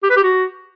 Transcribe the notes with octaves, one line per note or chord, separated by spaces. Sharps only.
G4
B4
G4
F#4